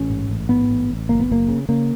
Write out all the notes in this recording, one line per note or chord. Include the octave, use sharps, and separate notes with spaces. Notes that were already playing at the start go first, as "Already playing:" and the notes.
Already playing: A1 C#4
G#2
A1
G#2 B3
A1
A1
F#1 A#3
B3
F#1 A#3
C#3
C#3 A#3